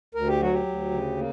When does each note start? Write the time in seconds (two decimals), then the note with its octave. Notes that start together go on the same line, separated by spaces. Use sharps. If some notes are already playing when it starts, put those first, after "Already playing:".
0.15 D2 A#4
0.28 G4
0.40 F#3 F#4
0.53 G4
0.66 D2
0.91 C#3
1.17 A#3